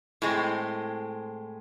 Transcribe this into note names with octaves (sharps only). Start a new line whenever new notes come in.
A2 G#3 C4